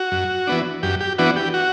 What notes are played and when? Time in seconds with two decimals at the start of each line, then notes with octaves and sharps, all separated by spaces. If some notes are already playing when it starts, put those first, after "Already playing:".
Already playing: F#4
0.11 F#2
0.47 E3 B3 D4
0.83 F#2 G4
1.00 G4
1.18 E3 B3 D4 F#4
1.36 G4
1.54 F#4